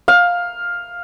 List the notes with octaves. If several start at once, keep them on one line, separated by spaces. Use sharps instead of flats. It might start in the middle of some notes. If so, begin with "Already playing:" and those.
F5